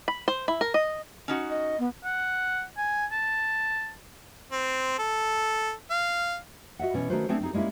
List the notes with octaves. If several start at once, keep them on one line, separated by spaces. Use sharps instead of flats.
B5
C5
E4
A#4
D#5
C#4 D#4 F#4
D#5
B3
F#5
G#5
A5
C4
A4
F5
F#4 D#5 E5 F#5
B2 E3 C#4
D#3 A3 C#4 F#4 B4 C5
A3 B3 C4 D4 G#4
C4 D#4 G#4
G3 G#3 A#3 C#4 E4